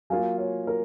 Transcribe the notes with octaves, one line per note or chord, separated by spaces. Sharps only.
F#3 A#3 F4 F5 G#5
C#5 F5
A#4